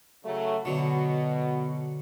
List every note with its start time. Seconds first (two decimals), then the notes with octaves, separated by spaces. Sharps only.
0.25 C#3 F#3 A3
0.65 B2 D3 F#3